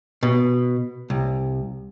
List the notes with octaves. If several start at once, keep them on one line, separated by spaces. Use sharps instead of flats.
B2
C2